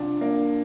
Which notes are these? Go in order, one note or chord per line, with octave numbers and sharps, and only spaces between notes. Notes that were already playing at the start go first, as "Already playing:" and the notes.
Already playing: C2 C3 F3 D4 F4
A#3 D4